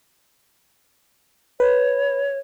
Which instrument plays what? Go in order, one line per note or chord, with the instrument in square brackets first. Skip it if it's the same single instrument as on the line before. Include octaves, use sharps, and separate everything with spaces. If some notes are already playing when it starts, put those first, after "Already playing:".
[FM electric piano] B4 [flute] C#5